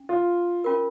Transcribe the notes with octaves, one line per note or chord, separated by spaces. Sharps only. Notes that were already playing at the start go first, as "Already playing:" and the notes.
Already playing: C#4
F4
C#4 F4 A#4